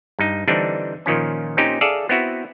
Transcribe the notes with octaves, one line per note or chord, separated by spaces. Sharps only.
G2 D#4
D3 E3 G3 C4 D4 D#4
A#2 D#3 F3 C#4
A#2 C4 C#4 D#4 G4
G#4 A4 D5 E5 F5
B3 C4 E4 F#4